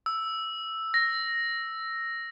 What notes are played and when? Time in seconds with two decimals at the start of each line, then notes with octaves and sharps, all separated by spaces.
0.06 E6
0.94 A#6